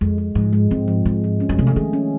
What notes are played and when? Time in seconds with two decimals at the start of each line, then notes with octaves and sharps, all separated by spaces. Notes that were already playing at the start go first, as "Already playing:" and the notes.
0.01 F2 G#3
0.18 G#3
0.35 G#2 F3
0.53 G#3
0.71 G#2 C4
0.88 F3
1.05 G#2 G#3
1.24 F3
1.40 C#4
1.49 F#2
1.58 C3 A3
1.67 C#3
1.76 D#3 G#4
1.93 C#4